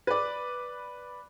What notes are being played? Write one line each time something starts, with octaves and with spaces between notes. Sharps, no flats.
B4 D5